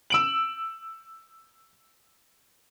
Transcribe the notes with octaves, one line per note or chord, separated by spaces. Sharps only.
E6 D7 F#7